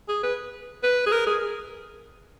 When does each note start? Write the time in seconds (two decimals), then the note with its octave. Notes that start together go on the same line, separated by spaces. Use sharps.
0.09 G#4
0.23 B4
0.83 B4
1.06 G#4
1.12 A#4
1.27 G#4